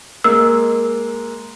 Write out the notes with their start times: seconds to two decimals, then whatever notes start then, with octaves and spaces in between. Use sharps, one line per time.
0.24 G#3 A#3 E6